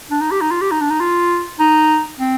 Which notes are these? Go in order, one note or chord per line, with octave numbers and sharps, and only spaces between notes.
D4
D#4
G4
D#4
F4
G4
D#4
D4
D#4
F4
D#4
C4